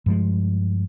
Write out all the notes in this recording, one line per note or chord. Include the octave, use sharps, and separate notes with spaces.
G2 F3 G#3